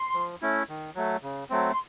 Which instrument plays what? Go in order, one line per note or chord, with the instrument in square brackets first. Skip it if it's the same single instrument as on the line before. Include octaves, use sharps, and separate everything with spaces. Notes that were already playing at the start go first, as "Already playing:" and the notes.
Already playing: [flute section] C6
[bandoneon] F3
A3 C#4 E4
D#3
F#3 A3
C#3
F#3 A3 C4
[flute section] C6